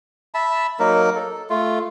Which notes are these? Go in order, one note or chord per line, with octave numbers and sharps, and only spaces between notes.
E5 A5 B5
F#3 A#3 D#4 A#4
A4
A3 F4